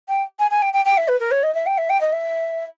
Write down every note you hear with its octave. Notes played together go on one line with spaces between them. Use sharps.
G5
G#5
G#5
G5
G5
G5
E5
B4
A#4
C#5
D#5
E5
G5
E5
G5
D#5
E5